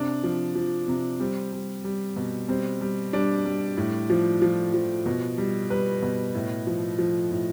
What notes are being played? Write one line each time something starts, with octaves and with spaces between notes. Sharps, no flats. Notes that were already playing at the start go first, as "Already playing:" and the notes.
Already playing: C3 D4
F3
F3
C3
G3 C4
G3
G3
B2
G3 C4
G3
G3 D4
G3
A2
F3
F3
F3
B2
G3
G3 B4
B2
A2
F3
F3
A2